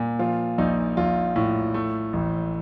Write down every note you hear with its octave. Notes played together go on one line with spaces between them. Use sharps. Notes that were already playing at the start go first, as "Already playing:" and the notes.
Already playing: A#2
F3 F4
A#1 D#4
A#1 F4
A2
A3
A1